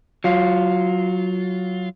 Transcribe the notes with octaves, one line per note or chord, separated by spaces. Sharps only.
F#3 F4